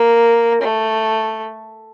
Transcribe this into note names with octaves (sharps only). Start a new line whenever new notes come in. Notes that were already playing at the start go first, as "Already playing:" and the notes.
Already playing: A#3
A3